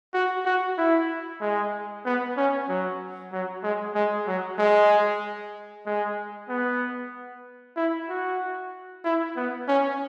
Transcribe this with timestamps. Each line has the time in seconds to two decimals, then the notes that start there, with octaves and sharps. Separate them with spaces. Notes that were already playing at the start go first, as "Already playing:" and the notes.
0.14 F#4
0.45 F#4
0.78 E4
1.41 G#3
2.05 B3
2.37 C#4
2.68 F#3
3.32 F#3
3.63 G#3
3.95 G#3
4.27 F#3
4.58 G#3
5.86 G#3
6.49 B3
7.76 E4
8.09 F#4
9.05 E4
9.36 B3
9.68 C#4